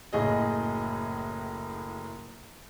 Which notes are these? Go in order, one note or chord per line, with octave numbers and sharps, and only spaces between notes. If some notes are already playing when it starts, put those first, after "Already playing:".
F#1 A2 G#4 D#5